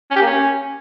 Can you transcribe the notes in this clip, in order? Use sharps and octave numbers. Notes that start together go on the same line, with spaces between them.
C#4
G4
A#3
C#4